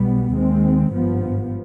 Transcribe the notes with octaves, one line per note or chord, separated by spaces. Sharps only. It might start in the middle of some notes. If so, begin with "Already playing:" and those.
Already playing: B1 B2 G3 B3
D#2 D#3 G#3 C4
G#1 G2 F3 B3